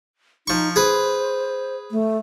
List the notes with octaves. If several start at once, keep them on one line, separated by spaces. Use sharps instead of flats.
F3 D#4 C#6
G#4 B4 C5
A3